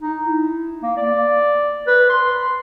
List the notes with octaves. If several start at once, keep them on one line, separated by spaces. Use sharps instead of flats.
D#4
E4
A#3
D5
B4
C6